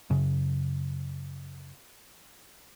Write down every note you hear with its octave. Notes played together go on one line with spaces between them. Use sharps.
F#2 C#3